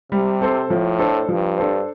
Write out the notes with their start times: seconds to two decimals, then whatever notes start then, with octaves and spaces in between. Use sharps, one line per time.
0.11 C3 G3
0.41 C4 A4 C5
0.70 A2 F3
0.99 D4 A4 C5
1.28 G2 F3
1.58 D4 A4 C5